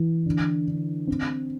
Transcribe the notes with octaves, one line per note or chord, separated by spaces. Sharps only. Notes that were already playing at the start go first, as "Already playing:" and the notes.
Already playing: E3
D3
D3
C4